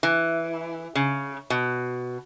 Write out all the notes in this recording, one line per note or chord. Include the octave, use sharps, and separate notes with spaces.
E3
C#3
B2